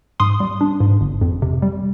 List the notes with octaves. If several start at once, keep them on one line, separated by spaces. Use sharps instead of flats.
G#2 C6 D#6
G3
D4
G#2
G1
F2
C3
G3